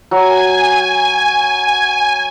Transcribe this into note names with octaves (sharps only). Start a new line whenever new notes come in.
F#3 G#5